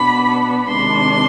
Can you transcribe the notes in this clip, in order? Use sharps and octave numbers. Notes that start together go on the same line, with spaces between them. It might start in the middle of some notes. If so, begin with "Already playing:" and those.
Already playing: B2 B3 D4 B5
C3 D#3 G#3 D4 C6